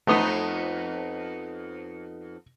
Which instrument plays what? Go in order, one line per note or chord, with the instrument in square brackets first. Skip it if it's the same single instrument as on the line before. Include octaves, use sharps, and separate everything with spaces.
[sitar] F2 B3 D#4 [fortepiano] A3 D#6